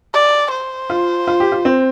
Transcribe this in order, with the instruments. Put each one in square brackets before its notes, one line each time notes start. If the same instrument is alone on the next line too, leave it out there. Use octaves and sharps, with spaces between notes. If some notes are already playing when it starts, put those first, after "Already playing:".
[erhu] D5
C5
[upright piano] F4
F4
G4
F4
C4